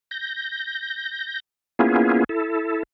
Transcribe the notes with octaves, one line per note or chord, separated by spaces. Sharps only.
G6 A#6
A#3 B3 C#4 E4 F4 G#4
E4 A4